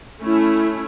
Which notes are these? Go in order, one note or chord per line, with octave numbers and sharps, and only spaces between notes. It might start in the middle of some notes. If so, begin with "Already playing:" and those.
A3 C#4 E4